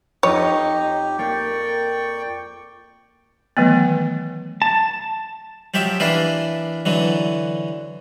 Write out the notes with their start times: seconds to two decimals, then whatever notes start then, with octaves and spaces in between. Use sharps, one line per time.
0.23 F2 D#4 G4 C#5 D#7
1.19 A#3 A#4 D5 G5 C#6 G6
3.57 D#3 E3 F#3 A3 B3
4.62 A5
5.74 F3 F#3 G4 E5
6.00 E3 A#3 D4 E4
6.86 D3 E3 F#3